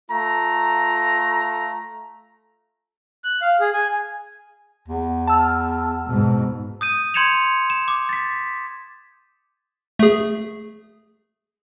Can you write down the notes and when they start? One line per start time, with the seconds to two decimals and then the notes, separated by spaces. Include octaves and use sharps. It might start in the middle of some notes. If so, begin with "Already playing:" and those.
0.11 A3 F4 A#5
3.24 F#6
3.42 F5
3.60 G#4
3.74 G#5
4.88 E2
5.28 A5 E6 F6
6.09 G#2 B2
6.81 D#6 G6 D#7
7.14 C6 G6 G#6 C#7 E7 F7
7.70 E7
7.88 D6
8.09 A6 B6
9.99 A3 G#4